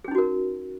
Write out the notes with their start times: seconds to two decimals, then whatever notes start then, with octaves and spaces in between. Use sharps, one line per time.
0.04 G#4
0.08 C#4
0.11 D#4
0.15 F#4
0.18 A#4